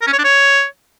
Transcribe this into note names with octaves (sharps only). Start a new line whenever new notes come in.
A#4
C#4
C#5
D4
C#5